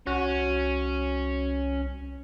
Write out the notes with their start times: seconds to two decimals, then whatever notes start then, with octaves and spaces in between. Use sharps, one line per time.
0.07 C2 C#4 F#4